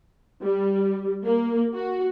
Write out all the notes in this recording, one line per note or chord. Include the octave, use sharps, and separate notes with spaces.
G3
A#3
F#4